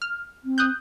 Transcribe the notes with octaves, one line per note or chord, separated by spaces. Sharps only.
F6
C4
D#6 F#6 G6